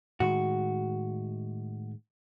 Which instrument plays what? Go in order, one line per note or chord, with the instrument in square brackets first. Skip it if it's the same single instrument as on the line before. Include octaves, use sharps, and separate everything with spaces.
[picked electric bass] A2 D#3 G#3 [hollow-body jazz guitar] F#4